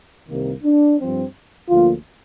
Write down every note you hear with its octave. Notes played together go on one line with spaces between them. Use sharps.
C2 C3 D#3 A#3
D4
G2 F3 C4
D2 D3 F3 A#3 F4